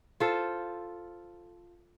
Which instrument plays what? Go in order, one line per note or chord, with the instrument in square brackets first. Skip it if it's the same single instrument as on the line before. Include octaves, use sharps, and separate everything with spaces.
[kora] F4 A4 C5